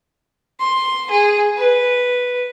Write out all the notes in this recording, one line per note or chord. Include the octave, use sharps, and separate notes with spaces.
C6
G#4
B4